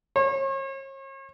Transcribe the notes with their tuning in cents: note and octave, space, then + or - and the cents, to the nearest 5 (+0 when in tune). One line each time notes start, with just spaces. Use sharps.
C#5 -40